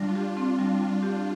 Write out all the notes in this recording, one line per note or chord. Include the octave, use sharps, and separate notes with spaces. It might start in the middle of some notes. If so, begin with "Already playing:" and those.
Already playing: G3 D4 F4
G4
C4
G3
G3
G4